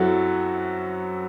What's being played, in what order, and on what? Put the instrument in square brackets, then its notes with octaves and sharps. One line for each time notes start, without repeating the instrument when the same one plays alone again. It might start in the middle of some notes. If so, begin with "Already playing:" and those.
Already playing: [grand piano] F#2 F#3 C4 E4 [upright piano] F#4 A4